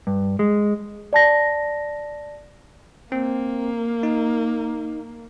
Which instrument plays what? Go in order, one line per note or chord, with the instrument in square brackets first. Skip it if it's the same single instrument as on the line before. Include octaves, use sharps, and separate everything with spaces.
[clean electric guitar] G2
G#3
[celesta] D5 A5 A#6
[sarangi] A#3 [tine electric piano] C4
[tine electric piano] D#4